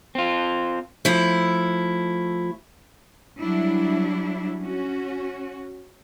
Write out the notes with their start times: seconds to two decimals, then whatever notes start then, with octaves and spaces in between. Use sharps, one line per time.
0.15 C4 F4
1.05 F3 A3 E4
3.39 F#3 G3 D4 E4
4.61 C#4 F#4